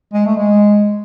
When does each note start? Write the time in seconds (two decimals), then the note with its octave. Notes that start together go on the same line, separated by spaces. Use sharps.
0.13 G#3
0.25 A3
0.37 G#3